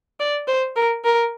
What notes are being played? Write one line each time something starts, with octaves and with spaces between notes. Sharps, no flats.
D5
C5
A#4
A#4